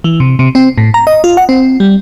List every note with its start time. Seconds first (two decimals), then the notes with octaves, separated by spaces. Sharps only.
0.04 E3
0.20 C3
0.39 C3
0.55 C4
0.78 A2
0.94 A#5
1.07 D#5
1.24 F4
1.37 F#5
1.49 C4
1.80 G3